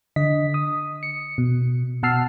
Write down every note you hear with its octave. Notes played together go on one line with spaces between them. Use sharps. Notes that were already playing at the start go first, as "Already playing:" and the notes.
D3 D#5 B6
D#6
C#7
B2
B2 F#5 A5 E6 F6 C7